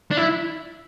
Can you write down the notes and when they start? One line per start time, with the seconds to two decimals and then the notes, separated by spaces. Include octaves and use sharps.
0.11 D4
0.17 E4